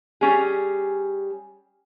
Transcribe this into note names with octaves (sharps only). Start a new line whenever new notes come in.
G3 C#4 G#4